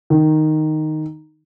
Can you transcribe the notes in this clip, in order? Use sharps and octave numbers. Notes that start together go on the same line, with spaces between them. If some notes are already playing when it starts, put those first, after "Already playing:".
D#3